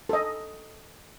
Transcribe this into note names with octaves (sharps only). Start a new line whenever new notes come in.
A4 D#5